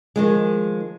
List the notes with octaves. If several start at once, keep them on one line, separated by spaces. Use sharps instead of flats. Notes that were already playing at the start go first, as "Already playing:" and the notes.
D#3 F3 G#3